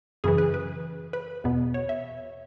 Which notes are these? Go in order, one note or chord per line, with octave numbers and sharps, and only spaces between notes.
F#2 C#3 E3 G#4
B4
B4
B4
E2 B2 B3
C#5
E5